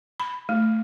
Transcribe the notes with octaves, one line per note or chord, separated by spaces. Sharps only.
B5
A3